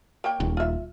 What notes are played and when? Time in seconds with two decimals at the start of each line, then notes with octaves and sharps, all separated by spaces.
0.24 A#3 C#5 G5
0.40 D#1
0.57 F4 E5